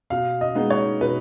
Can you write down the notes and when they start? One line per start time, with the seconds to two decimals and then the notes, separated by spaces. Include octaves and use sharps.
0.10 B2 F5
0.41 D#5
0.55 G#3 B3 D#4
0.70 C#5
1.01 B2 B4